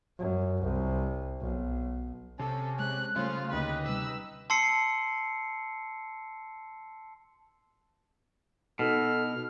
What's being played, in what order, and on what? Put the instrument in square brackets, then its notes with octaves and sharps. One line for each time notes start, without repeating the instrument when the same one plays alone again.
[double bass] F#2
C2
B1
[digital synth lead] C3 [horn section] C#4 [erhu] A4
[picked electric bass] G#3 [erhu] F#6
[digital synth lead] C#3 [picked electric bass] G3 A3 [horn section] C#4 C5 [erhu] F4
[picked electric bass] D2 A#3 C#4 [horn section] D#4 G4 D#5 [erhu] B4
[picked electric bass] C3 G3 [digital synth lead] B4 [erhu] E6
[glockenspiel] A5 C6 E6 C7 C#7
[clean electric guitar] B2 [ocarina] D#4 [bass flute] A4 [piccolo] F6